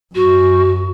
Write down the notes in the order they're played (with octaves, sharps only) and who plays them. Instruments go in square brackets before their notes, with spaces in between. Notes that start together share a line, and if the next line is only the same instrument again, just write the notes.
[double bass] F#2 [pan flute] F#4